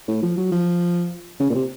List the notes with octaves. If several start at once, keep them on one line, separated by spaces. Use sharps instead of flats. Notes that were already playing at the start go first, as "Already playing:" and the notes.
A2
F3
F#3
F3
C#3
A#2
C3